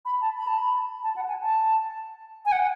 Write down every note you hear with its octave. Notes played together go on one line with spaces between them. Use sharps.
B5
A5
B5
A5
B5
A5
F#5
G#5
A5
G#5
F#5